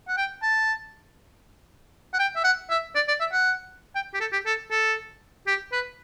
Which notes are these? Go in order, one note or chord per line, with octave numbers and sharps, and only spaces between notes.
F#5
G5
A5
F#5
G5
E5
F#5
E5
D5
D5
E5
F#5
G5
G4
A4
G4
A4
A4
G4
B4